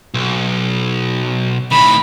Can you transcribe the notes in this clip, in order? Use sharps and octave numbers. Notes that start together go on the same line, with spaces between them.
B1
A2 D#3 B5